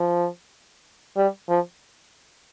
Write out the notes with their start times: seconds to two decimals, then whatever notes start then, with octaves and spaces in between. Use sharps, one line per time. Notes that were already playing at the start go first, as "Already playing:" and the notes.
Already playing: F3
1.17 G3
1.49 F3